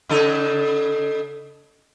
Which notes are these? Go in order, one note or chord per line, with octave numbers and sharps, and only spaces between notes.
C#3 D#4 A4